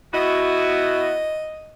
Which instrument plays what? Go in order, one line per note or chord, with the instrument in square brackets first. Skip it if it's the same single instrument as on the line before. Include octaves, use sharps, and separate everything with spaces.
[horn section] B3 E4 F#4 [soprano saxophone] D#5